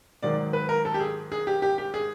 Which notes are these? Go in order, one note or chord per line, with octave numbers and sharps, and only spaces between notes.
G#2 D#3 F#3 D5
B4
A#4
A4
G4
G#4
G#4
G4
G4
G4
G#4